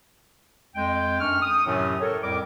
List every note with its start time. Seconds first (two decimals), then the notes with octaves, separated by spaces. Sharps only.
0.76 F2 G#3 G5
1.20 F#2 D4 C#6 F6
1.42 D#6
1.66 F#2 A2 C3 D#3 F#3
2.00 A4 A#4 C#5
2.23 F2 A2 G3 A#4 D6